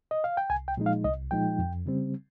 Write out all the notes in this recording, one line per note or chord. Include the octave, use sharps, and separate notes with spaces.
D#5
F5
G5
C2 G#5
G5
A#2 F3 G#3 D#4
F5
C2 D#5
A#2 F3 G#3 D#4 G5
F2
C#3 G3 C4